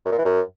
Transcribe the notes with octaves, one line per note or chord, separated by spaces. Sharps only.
F#2
A#2
E3
F#2